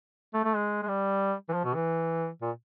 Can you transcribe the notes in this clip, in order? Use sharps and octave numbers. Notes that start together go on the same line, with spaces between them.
A3
A3
G#3
G#3
G3
E3
F3
B2
E3
A#2